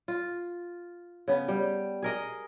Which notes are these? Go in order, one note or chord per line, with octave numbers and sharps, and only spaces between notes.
F4
C#3 B3
G3 G5
G#4 A#4 D#5